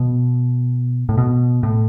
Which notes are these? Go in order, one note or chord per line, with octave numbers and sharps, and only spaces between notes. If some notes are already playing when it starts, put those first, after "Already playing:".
Already playing: B2
A2
B2
A2